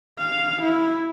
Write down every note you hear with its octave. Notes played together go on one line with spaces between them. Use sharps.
F5
E4